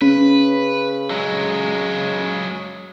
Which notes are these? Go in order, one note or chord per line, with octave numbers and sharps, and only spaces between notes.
C#3 C#4 B4
F#3 G#3